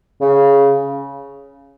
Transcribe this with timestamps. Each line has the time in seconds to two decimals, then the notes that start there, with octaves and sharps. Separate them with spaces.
0.21 C#3